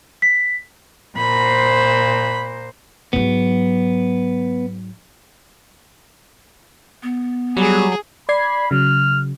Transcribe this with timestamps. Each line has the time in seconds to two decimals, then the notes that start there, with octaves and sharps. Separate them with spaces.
0.22 B6
1.17 A#2 C5 B5
3.13 G#2 F#3 B3
7.03 B3
7.57 F#3 G3 G#4 G#5
8.29 D5 B5 G#6 C7
8.71 C#3 F#3 F6